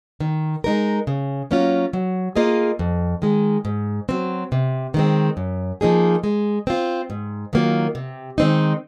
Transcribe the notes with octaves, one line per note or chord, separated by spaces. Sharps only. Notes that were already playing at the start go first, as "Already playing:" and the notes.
D#3
G#3 D#4 A#4
C#3
F#3 A#3 C#4 F4
F#3
A#3 F4 G#4 D#5
F2
D#3 G#3
G#2
F#3 C4
C3
D#3 G#3 C4
F#2
F3 A#3 D#4 G#4
G#3
C4 F4
G#2
D#3 F#3 A#3 F4
C3
D#3 G#3 C4 D#4